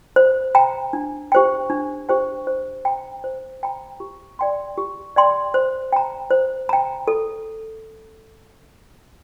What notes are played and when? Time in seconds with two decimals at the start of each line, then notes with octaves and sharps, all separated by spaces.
0.16 C5
0.55 G5 A#5
0.93 D4
1.32 G4 C5 G5
1.70 D4
2.09 G4 C5 G5
2.47 C5
2.85 G5 A#5
3.24 C5
3.63 G5 A#5
4.00 G4
4.39 D5 G5 C6
4.78 G4
5.16 D5 G5 C6
5.54 C5
5.93 G5 A#5
6.31 C5
6.69 G5 A#5
7.08 A4